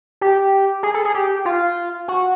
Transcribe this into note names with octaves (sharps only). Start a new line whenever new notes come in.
G4
G#4
A4
G#4
G4
F4
F#4